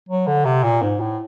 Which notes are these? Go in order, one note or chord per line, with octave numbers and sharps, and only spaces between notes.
F#3
D3
C3
A#2
G#2
A2